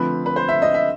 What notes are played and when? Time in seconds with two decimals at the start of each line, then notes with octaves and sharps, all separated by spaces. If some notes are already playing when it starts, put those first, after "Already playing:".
Already playing: D3 F3 A3 C4 B4
0.26 B4
0.36 C5
0.49 E5
0.62 D#5
0.74 E5